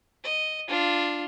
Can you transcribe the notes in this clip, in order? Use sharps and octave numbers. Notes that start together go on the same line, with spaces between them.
D#5
D4 F4